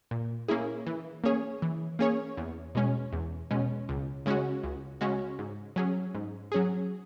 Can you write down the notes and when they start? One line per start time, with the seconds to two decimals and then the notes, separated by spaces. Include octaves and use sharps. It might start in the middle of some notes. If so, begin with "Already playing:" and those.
0.11 A#2
0.48 A#3 C#4 E4 G#4
0.87 E3
1.24 A#3 C#4 G#4 C#5
1.62 E3
1.99 A#3 C#4 G#4 C#5
2.37 E2
2.75 B2 G#3 C#4
3.13 E2
3.51 B2 G#3 C#4
3.89 C#2
4.26 C#3 G#3 C#4 F#4
4.63 C#2
5.01 C#3 G#3 C#4 F#4
5.39 G#2
5.76 F#3 C#4 G#4
6.14 G#2
6.52 F#3 C#4 G#4